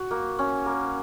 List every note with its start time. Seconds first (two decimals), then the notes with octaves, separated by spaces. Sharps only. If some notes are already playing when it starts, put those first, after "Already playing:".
Already playing: F#4
0.11 A#3
0.39 C#4
0.66 A#3